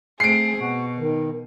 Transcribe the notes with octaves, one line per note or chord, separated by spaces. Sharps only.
A3 C4 G#4 C7 D7
B2 F#4
D#3